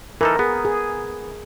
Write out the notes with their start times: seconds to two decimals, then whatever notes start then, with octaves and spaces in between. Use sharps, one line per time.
0.21 E3 D#4 A4 A#4
0.39 B3 G#4
0.65 G#4